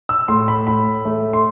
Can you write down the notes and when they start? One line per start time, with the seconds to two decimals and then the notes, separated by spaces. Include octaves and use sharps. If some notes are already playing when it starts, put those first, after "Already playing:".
0.09 E6
0.28 A2 C6
0.48 B5
0.67 A2 B5
1.05 A3
1.33 C6